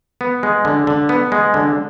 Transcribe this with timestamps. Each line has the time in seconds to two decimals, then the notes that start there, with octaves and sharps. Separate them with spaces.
0.21 B3
0.43 G#3
0.65 D3
0.87 D3
1.09 B3
1.32 G#3
1.54 D3